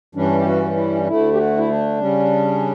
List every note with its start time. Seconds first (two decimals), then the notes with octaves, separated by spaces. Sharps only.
0.15 G2 E3 G3 C#4 D4
0.39 G4
0.46 F#4
0.76 E4
1.07 D2 D3 A3 E4
1.33 G4
1.38 F#4
1.58 E4
1.69 D4
2.00 C#3 G3 C#4